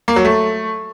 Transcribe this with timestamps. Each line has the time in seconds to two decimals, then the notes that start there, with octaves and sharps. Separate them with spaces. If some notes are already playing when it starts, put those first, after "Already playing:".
0.08 A#3
0.16 F#3
0.25 A3